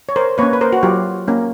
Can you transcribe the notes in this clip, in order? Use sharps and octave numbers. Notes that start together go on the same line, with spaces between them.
C#5
A#4 C5
A#3 C#4 B4 C#5
B4
A#4 C5
F#4
F#3 F4 G4
A#3 C#4